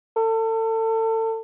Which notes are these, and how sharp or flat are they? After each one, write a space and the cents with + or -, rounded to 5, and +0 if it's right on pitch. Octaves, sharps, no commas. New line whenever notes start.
A4 +30